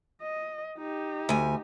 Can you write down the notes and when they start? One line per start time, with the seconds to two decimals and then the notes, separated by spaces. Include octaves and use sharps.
0.22 D#5
0.78 D#4 G4
1.29 D2 G#5